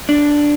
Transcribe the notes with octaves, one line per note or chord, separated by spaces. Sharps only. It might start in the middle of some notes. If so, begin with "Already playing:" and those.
D4